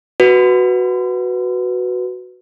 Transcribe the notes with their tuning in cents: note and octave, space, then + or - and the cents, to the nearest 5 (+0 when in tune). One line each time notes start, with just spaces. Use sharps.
F#4 +0 B4 +0